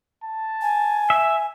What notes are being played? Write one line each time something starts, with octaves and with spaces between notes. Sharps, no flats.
A5
G#5
E5